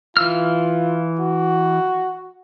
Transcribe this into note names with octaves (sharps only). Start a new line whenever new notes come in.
E3 F4 E6 F6
F#4